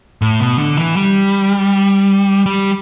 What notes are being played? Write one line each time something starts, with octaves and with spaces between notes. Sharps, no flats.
A2
B2
D3
E3
G3
G3